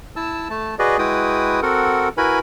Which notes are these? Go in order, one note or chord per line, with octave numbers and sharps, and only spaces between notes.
E4 A5 E6
A3 A5
F#4 G#4 B4 D5 D#5
G#3 E4 F#4 B4 G5 D#6
C4 F#4 A4 A#4 F#5
E4 F#4 A#4 B4 G#5 B5